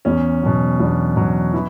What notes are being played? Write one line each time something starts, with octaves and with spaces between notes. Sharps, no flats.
E2 C#4
B2 F#3
E2 D4
B2 F#3
E3 E4